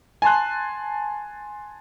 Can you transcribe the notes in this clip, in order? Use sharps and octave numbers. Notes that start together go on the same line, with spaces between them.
G#5 A5 C6 F#6